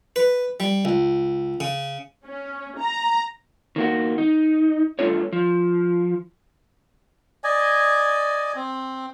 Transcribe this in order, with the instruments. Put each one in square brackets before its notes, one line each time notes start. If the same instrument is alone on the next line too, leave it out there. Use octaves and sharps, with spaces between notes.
[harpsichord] B4
G3
C#2
C#3
[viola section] C#4
A#5
[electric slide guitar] D#3 A#3 F#4
D#4
G2 A3 D4 F4 C#5
F3
[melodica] D5 D#5 G#5
C4